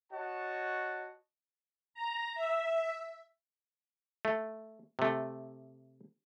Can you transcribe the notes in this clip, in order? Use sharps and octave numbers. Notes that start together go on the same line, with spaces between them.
F#4 C#5 D#5 F#5 A5
A#5
E5
A3
C3 A3